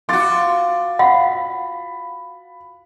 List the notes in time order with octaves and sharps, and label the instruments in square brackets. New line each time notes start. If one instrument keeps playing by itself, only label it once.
[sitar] F4 F#4 [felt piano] D6 A6
[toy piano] F5 F#5 [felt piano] B5